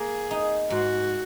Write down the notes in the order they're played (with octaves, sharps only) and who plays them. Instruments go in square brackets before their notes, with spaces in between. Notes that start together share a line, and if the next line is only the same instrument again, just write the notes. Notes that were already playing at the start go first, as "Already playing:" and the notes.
Already playing: [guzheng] A#3 [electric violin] G#4
[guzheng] D#4
[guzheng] G#2 [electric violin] F#4